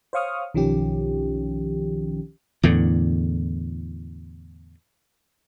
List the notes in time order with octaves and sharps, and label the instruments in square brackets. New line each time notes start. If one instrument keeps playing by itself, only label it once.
[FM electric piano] C5 C#5 F5 C#6 D#6 F6
B1 D#3 F3 C#4 G4
[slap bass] E2 A2 D3